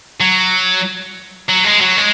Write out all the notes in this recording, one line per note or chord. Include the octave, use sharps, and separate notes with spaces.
F#3
F#3
G#3
F#3
G#3